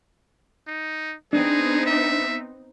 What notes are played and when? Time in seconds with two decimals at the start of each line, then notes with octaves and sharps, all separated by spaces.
0.67 D#4
1.33 B3 C4 D4 D#4 G#4
1.87 E5